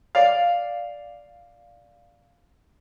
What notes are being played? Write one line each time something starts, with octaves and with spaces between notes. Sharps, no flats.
D5 F5